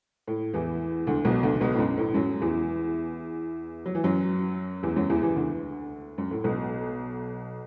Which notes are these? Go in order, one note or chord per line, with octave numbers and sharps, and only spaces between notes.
A2
E2 E3
D2 D3
B1 B2
D2 D3
D3
B1 B2
A2
F#2
A2
F#2 F#3
E2 E3
F#3
E3
F#2 F#3
E2 E3
F#2 F#3
E2 E3
E2 E3
D2 D3
F#2
A2
B1 B2